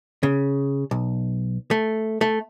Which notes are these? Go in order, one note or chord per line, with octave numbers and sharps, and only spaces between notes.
C#3
B1
A3
A3